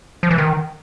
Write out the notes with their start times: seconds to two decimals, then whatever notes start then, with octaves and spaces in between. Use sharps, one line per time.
0.23 F3
0.31 E3
0.38 D#3